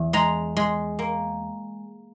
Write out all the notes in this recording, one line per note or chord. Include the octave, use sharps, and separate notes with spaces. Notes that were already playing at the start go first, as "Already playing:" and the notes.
Already playing: E2
G#3 A#5
G#3
A#3